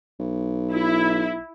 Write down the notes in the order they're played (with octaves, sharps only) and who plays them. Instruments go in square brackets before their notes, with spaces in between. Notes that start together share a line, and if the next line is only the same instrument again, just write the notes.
[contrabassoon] B1
[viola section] E4